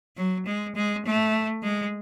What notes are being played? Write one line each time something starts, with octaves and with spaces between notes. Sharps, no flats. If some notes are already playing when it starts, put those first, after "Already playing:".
F#3
G#3
G#3
A3
G#3